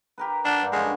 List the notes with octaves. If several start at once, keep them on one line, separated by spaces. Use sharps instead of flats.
G4 A#4 B4
D4 F#5
G2 D5
D3 F3 G#3 C#4